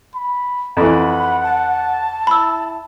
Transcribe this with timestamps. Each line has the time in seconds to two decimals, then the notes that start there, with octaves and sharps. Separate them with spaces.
0.15 B5
0.77 F2 E3 F#5 B5
1.43 A5
2.27 E4 B5 E6